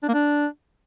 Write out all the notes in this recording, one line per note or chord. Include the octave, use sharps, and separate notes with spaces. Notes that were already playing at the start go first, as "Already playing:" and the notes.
D4
A#3
D4